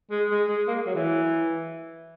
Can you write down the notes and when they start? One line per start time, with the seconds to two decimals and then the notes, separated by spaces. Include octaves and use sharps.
0.11 G#3
0.30 G#3
0.49 G#3
0.68 A#3
0.86 F#3
0.95 E3